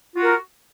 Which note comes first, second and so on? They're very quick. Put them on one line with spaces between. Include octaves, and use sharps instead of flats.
F4 F#4 A#4